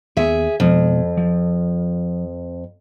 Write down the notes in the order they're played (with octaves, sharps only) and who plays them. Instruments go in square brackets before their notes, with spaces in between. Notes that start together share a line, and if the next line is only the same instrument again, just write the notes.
[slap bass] D#2 B3 [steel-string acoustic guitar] G#4 E5
[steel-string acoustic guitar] F2 [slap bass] B2 G#3
[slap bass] F3